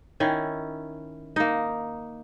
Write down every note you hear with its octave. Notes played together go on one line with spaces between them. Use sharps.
D#3 C#4 E4
A#3 D#4